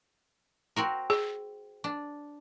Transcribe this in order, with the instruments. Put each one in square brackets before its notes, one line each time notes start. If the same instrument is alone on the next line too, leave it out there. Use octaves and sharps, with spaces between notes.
[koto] C4 F#4 A#4
[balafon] G#4
[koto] D4